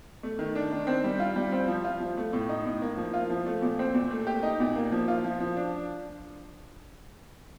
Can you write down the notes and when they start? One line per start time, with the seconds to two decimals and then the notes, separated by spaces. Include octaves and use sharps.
0.23 A3
0.39 D#3
0.55 D4
0.72 D#3
0.87 C4
1.04 G3
1.20 F4
1.36 G3
1.52 C4
1.68 F3
1.84 F4
2.00 F3
2.17 A3
2.33 A2
2.49 D#4
2.65 A2
2.82 A#3
2.97 F3
3.14 F4
3.30 F3
3.46 A3
3.62 A#2
3.79 C4
3.95 A#2
4.11 A3
4.27 G4
4.43 D#4
4.60 A#2
4.76 A#3
4.92 F3
5.08 F4
5.24 F3
5.40 F3
5.57 D4